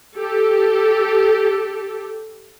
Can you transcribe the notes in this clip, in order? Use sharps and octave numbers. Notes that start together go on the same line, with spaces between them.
G4 A4